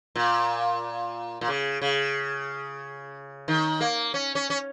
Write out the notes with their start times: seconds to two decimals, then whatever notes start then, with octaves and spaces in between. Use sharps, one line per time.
0.16 A#2
1.41 A#2
1.48 C#3
1.82 C#3
3.48 D#3
3.81 A#3
4.14 C#4
4.35 C#4
4.50 C#4